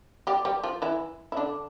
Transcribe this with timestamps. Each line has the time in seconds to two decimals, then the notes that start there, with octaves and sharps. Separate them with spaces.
0.27 G3 G4
0.45 G3 G4
0.64 F3 F4
0.82 E3 E4
1.32 E4
1.37 D3 D4